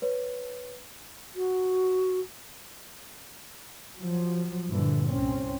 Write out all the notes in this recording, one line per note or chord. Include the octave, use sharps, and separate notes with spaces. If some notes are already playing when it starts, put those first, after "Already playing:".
B4 C#5
F#4
F3 F#3
G2 A#2 D3 E3
C2 C4 C#4